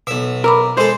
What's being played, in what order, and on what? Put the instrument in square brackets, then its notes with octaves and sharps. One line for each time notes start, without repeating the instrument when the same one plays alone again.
[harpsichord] B1 E5 [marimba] B2
[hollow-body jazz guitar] A#4 [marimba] B5 D6 E6
[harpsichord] G#3 A4 [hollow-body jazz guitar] C5